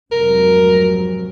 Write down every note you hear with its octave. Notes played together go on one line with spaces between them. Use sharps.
F1 G#2 F#3 A#4